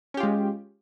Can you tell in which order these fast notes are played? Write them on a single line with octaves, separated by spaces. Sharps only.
C#4 G4 F4 G#3